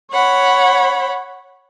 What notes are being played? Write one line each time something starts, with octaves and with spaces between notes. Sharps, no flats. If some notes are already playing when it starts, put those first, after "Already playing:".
C#5 F#5 B5